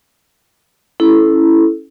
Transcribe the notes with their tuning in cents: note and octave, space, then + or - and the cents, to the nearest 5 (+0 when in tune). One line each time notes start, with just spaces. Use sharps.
C#4 +0 E4 +0 A4 -15